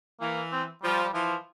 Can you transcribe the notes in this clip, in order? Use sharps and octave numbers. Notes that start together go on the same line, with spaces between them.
E3 A#3
C4
F3 G3
G3
E3 F3